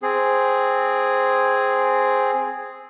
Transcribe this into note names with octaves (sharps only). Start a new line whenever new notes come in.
C4 G#4